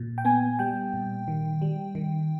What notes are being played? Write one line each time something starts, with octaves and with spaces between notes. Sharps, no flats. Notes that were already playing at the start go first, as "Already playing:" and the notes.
Already playing: A#2
G5
B3 G#5
G3 G5
A#2
D#3
G3
D#3